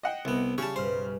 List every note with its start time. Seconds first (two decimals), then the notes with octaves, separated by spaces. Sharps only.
0.03 D#5 F#5 G5 C7 E7
0.25 C2 B3 E5 E6 D7
0.58 C#3 G3 C#5 A5
0.76 B1 G2 C5 F6